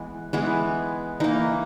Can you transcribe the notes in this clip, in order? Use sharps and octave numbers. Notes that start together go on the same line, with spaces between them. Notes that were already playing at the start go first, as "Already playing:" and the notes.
Already playing: E3 G#3 B3
E3 G#3 B3 G#4
E3 A#3 D#4